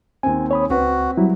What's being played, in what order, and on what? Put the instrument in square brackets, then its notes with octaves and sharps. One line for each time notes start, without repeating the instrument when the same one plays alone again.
[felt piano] D#2 C4 [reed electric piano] G#5
[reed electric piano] C#5 B5 D#6
[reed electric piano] C#2 [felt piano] C4 B4 [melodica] F#4
[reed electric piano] F#3 G3 E4